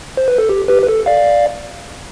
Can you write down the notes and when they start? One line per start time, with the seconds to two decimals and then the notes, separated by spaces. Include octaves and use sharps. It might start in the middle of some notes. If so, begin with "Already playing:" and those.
0.17 C5
0.28 B4
0.38 A4
0.49 G4
0.68 G4 B4
0.82 B4
0.88 A4
1.06 D5 F5